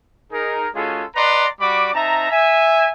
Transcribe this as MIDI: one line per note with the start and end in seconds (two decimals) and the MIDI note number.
0.32 0.68 63
0.32 0.68 68
0.32 0.68 70
0.75 1.04 56
0.75 1.04 61
0.75 1.04 65
0.75 1.04 66
0.75 1.04 68
0.75 1.04 69
1.16 1.47 71
1.16 1.47 74
1.16 1.47 75
1.16 1.47 78
1.16 1.47 82
1.16 1.47 84
1.61 1.92 55
1.61 1.92 66
1.61 1.92 74
1.61 1.92 83
1.61 1.92 86
1.94 2.29 60
1.94 2.29 63
1.94 2.29 76
1.94 2.29 81
1.94 2.29 82
2.30 2.92 76
2.30 2.92 80